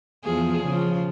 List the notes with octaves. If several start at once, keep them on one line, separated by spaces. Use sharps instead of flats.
E2 F3 G#4
C#3 F3